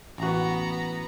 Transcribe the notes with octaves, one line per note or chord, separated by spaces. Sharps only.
A1 B3 F#4 A#5